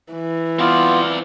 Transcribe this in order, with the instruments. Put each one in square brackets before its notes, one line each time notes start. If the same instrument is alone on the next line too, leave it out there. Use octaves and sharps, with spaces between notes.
[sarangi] E3
[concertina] B3 F4 [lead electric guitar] C4 D5